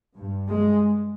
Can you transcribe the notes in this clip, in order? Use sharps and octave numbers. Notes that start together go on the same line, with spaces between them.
G2
G#3